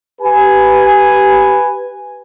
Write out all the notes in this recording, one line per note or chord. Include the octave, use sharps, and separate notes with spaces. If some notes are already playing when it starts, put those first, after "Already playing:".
G4 B4 G#5